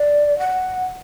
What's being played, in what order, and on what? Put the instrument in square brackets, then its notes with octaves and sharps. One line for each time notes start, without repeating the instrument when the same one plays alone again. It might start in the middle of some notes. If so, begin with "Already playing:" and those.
Already playing: [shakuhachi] D5
F#5